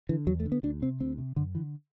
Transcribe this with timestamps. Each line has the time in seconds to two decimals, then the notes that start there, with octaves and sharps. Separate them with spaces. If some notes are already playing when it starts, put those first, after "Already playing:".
0.09 D3 E3
0.27 E2 F#3
0.40 A3
0.46 D3
0.52 B3
0.63 D2 D4
0.82 C3 C4
1.00 D2 C4
1.18 C3
1.36 F#2 D3
1.55 D3 E3